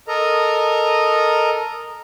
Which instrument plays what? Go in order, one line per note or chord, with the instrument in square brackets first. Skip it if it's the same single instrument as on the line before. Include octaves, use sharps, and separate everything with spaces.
[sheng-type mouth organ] A4 A#4 D#5 A#5